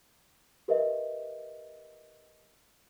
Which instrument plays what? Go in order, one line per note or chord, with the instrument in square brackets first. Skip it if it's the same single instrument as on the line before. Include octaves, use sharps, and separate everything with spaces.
[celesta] G4 A#4 B4 D#5 E5